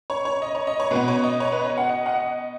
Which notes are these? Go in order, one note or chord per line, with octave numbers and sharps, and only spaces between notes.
C#5
C#5
D#5
C#5
D#5
C#5
B2 B3 B4
C#5
D#5
C#5
B4
D#5
C#5
F#5
D#5
F#5
D#5